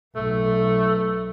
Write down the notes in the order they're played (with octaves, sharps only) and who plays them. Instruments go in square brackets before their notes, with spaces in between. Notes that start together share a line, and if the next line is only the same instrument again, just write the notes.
[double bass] B1 [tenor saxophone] A3